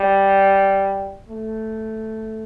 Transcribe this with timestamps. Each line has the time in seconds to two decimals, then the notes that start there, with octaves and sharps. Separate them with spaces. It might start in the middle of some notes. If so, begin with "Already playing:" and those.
Already playing: G3
1.29 A3